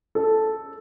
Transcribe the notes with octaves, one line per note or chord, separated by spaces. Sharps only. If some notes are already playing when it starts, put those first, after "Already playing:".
A4